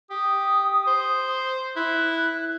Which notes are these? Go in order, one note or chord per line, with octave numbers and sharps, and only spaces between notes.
G4 D#6
C5
E4 F#6